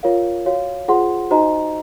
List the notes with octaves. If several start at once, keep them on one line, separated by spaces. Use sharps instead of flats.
F4 A#4 C#5 F5
F#4 C#5 F5
F4 G#4 C5 F#5 C6
D#4 F#4 C5 D#5 A#5